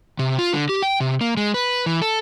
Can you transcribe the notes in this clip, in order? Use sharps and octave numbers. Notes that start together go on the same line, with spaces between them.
C3
F4
D3
G4
G5
C3
A#3
G#3
B4
E3
A4